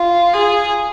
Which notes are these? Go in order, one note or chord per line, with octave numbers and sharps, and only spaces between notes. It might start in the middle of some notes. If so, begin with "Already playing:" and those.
Already playing: F4
G#4